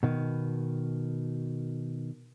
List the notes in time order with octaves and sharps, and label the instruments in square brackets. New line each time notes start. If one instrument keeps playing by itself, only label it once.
[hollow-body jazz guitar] B2 D#3